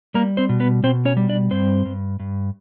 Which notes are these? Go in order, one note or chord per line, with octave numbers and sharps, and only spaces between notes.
G3 A#3 A#4
C4 C5
B2
B3 B4
B2 C4 C5
C#4 C#5
G3
D4 D5
G2 C4 C5
G2
G2